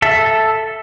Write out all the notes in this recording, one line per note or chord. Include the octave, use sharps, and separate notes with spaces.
A4 E5